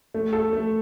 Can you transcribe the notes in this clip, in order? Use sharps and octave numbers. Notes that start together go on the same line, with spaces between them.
A3
A4
A3